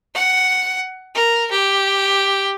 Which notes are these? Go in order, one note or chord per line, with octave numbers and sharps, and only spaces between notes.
F#5
A#4
G4